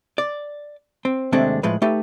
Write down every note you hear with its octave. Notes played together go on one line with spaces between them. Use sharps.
D5
C4
D#2 C3 G#3 A3 C4 D4
A2 F3 G#3 B4
A3 D#4 G4 A4 B4